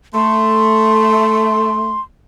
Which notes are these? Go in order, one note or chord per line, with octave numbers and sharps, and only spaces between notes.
A3 C6